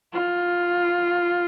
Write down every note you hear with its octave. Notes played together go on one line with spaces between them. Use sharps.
F4